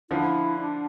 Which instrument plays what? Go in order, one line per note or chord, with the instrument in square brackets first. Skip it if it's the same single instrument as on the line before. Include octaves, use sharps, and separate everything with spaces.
[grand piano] D3 F3 [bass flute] E4
[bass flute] D4